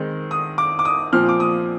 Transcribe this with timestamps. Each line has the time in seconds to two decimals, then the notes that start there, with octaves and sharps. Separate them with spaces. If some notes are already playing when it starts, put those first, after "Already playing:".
Already playing: D#3 G#3 C4
0.31 D#6
0.58 D6
0.79 D6
0.85 D#6
1.13 A#2 F3 C4 F6
1.29 D6
1.40 D#6